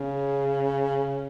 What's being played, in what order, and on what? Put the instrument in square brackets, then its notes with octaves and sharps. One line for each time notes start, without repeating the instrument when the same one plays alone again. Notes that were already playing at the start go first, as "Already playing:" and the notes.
Already playing: [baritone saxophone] C#3